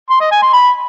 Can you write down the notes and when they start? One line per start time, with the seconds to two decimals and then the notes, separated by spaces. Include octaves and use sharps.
0.10 C6
0.21 D#5
0.32 G#5
0.42 C6
0.53 B5